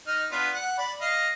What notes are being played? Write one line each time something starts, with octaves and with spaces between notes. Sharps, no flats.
D#4 F6
B3 D4 F4
F#5
D5 B5
D#5 F5